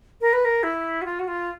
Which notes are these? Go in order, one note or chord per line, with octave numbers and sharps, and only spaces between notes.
A#4
B4
A#4
E4
F#4
F4
F#4
F4